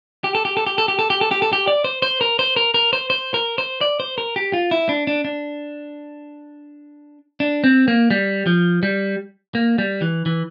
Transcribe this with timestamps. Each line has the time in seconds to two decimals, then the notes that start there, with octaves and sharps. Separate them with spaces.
0.24 G4
0.35 A4
0.45 G4
0.57 A4
0.67 G4
0.78 A4
0.88 G4
0.99 A4
1.10 G4
1.21 A4
1.31 G4
1.42 A4
1.53 G4
1.68 D5
1.84 C5
2.02 C5
2.21 A#4
2.39 C5
2.56 A#4
2.74 A#4
2.93 C5
3.10 C5
3.34 A#4
3.58 C5
3.81 D5
4.00 C5
4.18 A#4
4.36 G4
4.53 F4
4.71 E4
4.89 D4
5.07 D4
5.25 D4
7.40 D4
7.64 C4
7.88 A#3
8.11 G3
8.47 F3
8.83 G3
9.55 A#3
9.78 G3
10.02 E3
10.26 E3